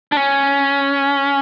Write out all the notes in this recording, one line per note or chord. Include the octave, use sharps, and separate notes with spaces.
D4
C#4